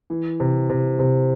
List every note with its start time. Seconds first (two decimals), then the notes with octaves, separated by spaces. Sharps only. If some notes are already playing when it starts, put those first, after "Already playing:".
0.10 E3
0.40 C3
0.70 C3
0.99 C3